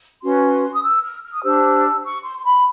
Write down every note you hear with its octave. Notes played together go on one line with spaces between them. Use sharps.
C#4 F#4 B4 C6
D#6
E6
F6
F6
D#6
D4 G4 C5 E6
C#6
C6
C6
B5